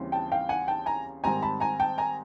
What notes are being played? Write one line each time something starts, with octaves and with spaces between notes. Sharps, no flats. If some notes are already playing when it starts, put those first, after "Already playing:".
Already playing: D#2 C#3 E3 G3 C4
G5 A5
F5 G5
F#5 G#5
G5 A5
G#5 A#5
G#2 D#3 G3 C4 G#5 A#5
A5 B5
G#5 A#5
G5 A5
G#5 A#5